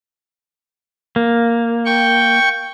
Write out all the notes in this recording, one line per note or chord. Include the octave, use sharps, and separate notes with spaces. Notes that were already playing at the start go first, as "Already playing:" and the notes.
A#3
G5 C#6